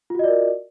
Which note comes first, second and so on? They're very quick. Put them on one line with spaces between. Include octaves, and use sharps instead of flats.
F4 F#4 D#5 D5 A#4